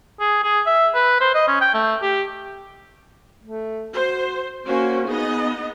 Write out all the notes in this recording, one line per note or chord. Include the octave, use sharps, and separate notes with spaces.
G#4
G#4
E5
B4
C5
D#5
C#4
G5
A3
G4
A3
F#4 C5
A#3 C#4 F#4 C5
B3 D#4 G#4 D#5